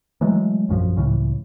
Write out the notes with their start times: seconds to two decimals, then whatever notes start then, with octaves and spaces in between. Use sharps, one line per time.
0.21 E3 F#3 G#3 A3
0.69 A#1 F#2 C#3 F3
0.96 C#2 A2 C#3 E3